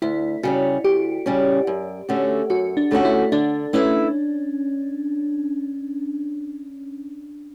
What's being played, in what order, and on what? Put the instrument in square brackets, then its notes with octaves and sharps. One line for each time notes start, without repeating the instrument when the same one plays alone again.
[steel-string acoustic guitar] D2 [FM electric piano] E4
[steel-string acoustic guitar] C#3 G3 C#4 [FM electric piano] F#4
[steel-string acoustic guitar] D2 [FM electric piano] G4
[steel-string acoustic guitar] C#3 G3 C#4
F#2
D3 A3 C#4 F#4
[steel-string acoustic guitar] F#2 [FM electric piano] F#4
[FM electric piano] D4
[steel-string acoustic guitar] D3 A3 C#4 F#4
[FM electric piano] E4
[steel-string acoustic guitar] D3 [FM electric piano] D4
[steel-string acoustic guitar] A3 E4 B4 E5 [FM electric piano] C#4